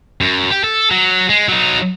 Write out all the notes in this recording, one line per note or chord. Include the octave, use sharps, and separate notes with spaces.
F#2
G4
A4
F#3
G#3
F#3 D#4